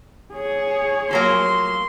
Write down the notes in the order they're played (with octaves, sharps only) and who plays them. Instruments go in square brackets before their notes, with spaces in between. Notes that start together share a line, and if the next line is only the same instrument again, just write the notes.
[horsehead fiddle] G#4 C#5
[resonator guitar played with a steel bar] F3 F#3 A#3 [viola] C6